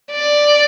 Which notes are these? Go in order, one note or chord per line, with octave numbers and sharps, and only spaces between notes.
D5